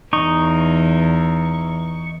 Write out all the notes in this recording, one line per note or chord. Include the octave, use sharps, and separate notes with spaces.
E2 E3 D#4 C#6